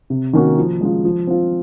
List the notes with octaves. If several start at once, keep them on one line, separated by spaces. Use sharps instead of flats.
C3
D#3 A#3 C#4 F#4
F3
G#3 C#4 F4
F3
C4 F4